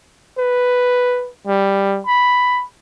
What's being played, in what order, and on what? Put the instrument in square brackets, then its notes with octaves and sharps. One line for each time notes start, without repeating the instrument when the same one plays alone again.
[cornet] B4
G3
B5